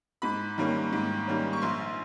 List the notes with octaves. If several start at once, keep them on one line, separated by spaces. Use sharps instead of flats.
G#2 B5
D#3 G3 A#3 C#4
G#2
D#3 G3 A#3 C#4
C#6
A#1 C6